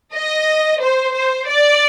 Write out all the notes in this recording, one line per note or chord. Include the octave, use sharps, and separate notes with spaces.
D#5
C5
C5
D5